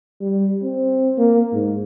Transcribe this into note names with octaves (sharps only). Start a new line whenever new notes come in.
G3
C4
A#3
G#2